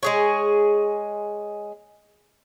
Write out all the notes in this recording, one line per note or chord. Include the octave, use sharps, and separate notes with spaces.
G#3 G#4 C#5